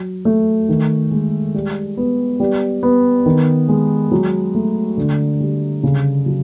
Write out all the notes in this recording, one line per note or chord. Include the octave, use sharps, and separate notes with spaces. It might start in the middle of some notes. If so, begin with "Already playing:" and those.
Already playing: F#3
A3
D#3
G#3
G3
B3
G3
B3
D#3
G#3
F#3
A3
D3
G3
C#3
F#3